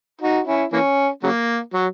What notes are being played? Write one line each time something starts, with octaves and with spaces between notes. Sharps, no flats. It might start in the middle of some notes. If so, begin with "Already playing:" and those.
D#4 F#4
C#4 E4
E3 A#3 C#4
C#3 F#3 A#3
F#3